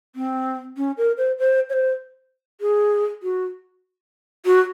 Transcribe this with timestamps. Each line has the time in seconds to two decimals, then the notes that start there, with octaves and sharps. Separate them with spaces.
0.16 C4
0.77 C#4
0.98 A#4
1.18 C5
1.39 C5
1.70 C#5
1.73 C5
2.61 G#4
3.23 F#4
4.45 F#4